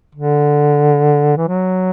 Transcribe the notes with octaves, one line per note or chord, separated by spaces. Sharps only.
D3
E3
F#3